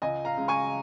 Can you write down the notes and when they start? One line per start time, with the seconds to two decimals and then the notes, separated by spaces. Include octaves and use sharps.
0.02 C#2 D#5 G#5
0.25 F5 A#5
0.37 C#3 G#3
0.48 G#5 C#6